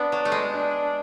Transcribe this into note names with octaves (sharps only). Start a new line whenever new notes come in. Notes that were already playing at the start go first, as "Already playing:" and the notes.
Already playing: B3 D4
F#3
A3
G#3
D4